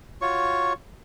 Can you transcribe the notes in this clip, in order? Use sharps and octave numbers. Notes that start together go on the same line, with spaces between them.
F4 F#4 C#5 C#6